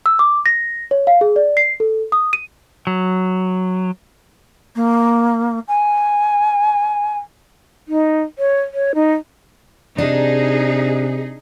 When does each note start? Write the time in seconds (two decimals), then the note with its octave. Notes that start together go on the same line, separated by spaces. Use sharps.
0.06 E6
0.19 D6
0.46 A#6
0.91 C#5
1.07 F5
1.21 G#4
1.36 D5
1.57 C7
1.80 A4
2.12 D#6
2.33 D#7
2.87 F#3
4.75 A#3
5.67 G#5
7.88 D#4
8.39 C#5
8.74 C#5
8.95 D#4
9.98 C3 D4 D#4 G#4